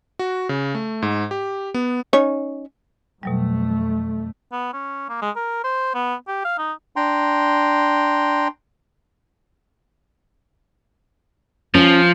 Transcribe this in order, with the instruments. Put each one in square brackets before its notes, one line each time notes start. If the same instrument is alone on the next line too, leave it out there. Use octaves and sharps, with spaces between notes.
[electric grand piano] F#4
C#3
A3
G#2
G4
B3
[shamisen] C#4 D#4 C#5
[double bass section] F2 A3 [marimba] B2 F#3 G3
[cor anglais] B3
C#4
A#3
G#3
A#4
C5
B3
G4
F5
D#4
[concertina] D4 G5 A#5 C6
[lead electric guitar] F3 [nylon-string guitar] C#4